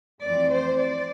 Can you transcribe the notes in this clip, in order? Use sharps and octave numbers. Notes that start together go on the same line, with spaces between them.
F2 E3 A3 C4 D5
C5
D5